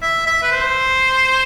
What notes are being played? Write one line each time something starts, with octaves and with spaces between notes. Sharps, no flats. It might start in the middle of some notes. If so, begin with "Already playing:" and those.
E5
E5
B4
C5